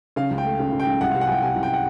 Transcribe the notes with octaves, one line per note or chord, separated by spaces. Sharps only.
C#3 F5
C#2
G5
A3
C#3
C#3
G5
C#2
C2 F#5
C3 F5
F#5
C2 G5 G#5
C3 G#5
C2
G5
F#5